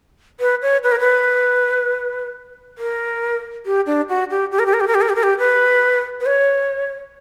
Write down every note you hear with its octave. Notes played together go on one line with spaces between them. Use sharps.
B4
C#5
B4
A#4
B4
A#4
G4
D4
F#4
G4
G4
A#4
G4
A#4
G4
A#4
G4
A#4
G4
A#4
G4
B4
B4
C#5